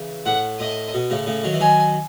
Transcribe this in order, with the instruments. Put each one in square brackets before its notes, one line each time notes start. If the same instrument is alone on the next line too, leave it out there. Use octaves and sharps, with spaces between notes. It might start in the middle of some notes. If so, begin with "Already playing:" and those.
Already playing: [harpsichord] C#3 E3
[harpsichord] A2 [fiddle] F#5
[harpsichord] A2 [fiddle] D#5
[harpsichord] B2
A2 C#3
A2 C#3
D#3 F#3
E3
[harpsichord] D#3 F#3 [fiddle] G#5